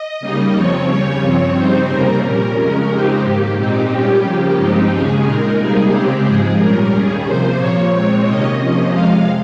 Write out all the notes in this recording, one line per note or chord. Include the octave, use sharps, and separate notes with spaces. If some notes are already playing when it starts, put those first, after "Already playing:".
Already playing: D#5
C#3 G3 A#3 D#4
F2 C#3 F3 C4 C#5
D#2 C#3 G3 C#4 C#5
G2 F3 C4 C#5
C#3 G3 C4 D#4 C5
F2 C3 G3 A#3 C#4 A#4
A#2 G3 C#4 A#4
F2 C#3 G#3 C#4 A#4
F2 C#3 G#3 C4 D#4 G4
G#2 D#3 A#3 G4
A#2 G#3 C4 D#4 G4
A#2 G3 C#4 G4
C#3 F3 A#3 C#4
G2 F3 G#3 C4 D#4
D#2 C#3 G#3 C#4 G#4
A#2 G#3 D#4 A#4
C3 G3 A#3 D#4 G#4
C#3 G#3 C4 G4
G#2 F3 G#3 G#4
A#2 G3 C#4 A#4
D#2 D#3 G3 C#4 G#4
C3 F3 A#3 C5
A#2 F3 A#3 C#5
A#2 G#3 C4
C3 D#3 A#3 C#4 D#5
C3 F3 A#3 C#4 D#5
F2 C3 F3 G#3 F5